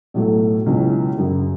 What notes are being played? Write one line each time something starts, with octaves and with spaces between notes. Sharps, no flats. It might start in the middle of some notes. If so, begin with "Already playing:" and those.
B1 A2 F#3 A3
C#2 B2 F#3 C#4 E4
F#2 C#3 F#3